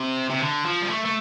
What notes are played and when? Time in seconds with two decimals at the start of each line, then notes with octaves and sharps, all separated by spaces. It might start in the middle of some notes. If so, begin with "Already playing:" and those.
Already playing: C3
0.30 C3
0.41 D3
0.65 F3
0.82 G3
0.90 A3
1.05 A3